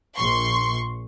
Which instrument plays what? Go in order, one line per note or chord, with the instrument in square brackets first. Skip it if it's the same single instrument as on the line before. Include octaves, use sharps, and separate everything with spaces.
[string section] A#1 C6 C#6